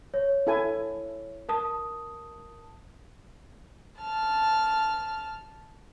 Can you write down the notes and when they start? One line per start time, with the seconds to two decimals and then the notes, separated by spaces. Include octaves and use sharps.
0.14 C#5
0.47 E4 A4 G#5
1.49 A#4 A5 D#6
4.01 A5 F6